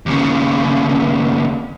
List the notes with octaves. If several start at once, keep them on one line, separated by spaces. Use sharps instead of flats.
D#2 C#3